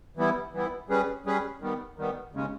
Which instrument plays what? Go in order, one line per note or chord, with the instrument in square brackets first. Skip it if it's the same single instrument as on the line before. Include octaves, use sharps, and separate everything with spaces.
[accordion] E3 G3 B3 E4
E3 G3 B3 E4
G3 C#4 G#4 B4
G3 C#4 G#4 B4
D#3 G3 B3
D#3 G3 B3
D#2 C#3 G#3 C#4